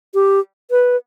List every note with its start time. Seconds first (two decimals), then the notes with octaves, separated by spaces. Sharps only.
0.14 G4
0.71 B4